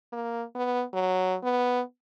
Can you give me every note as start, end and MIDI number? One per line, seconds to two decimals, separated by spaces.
0.12 0.43 58
0.55 0.83 59
0.93 1.35 54
1.43 1.81 59